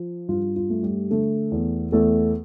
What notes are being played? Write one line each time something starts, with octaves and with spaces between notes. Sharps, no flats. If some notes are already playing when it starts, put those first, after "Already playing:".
Already playing: F3
G2 F4
F4
A3
G3 G4
D3 A3 A4
E2
E2 A3 A4